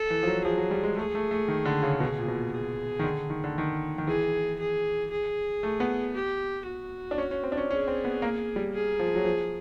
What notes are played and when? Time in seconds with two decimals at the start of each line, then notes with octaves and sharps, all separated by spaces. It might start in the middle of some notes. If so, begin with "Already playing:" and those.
Already playing: A4
0.10 E3
0.23 F3
0.27 F#3
0.45 F3 G#4
0.58 F#3
0.71 G3
0.83 G#3
0.96 A3 G#4
1.15 A3
1.31 A3
1.48 D#3
1.65 D3
1.83 C#3
2.00 B2 G#4
2.18 A#2
2.28 B2
2.35 A#2
2.52 G#4
2.99 D#3
3.04 D3
3.30 D#3
3.44 D3
3.58 D#3
3.98 D#3
4.07 E3 G#4
4.60 G#4
5.11 G#4
5.63 A3
5.80 B3
6.15 G4
6.66 F#4
7.11 D4
7.18 C#4
7.31 C#4
7.43 C4
7.52 D4
7.57 C#4
7.70 C#4 G#4
7.87 C4
8.04 B3
8.22 A#3
8.56 G3
8.74 G#4
8.99 F3
9.16 F#3
9.25 F3